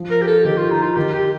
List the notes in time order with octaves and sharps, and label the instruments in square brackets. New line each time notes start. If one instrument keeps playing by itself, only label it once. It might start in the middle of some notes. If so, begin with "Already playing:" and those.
Already playing: [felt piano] F3
[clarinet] A#4
G4
A4
[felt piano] D#3 [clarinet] G4
[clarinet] F4
D#4
F4
[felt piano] D#3 [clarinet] G4
[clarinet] G4